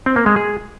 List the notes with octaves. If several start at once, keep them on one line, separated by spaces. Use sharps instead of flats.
C4
A#3
G#3
G#4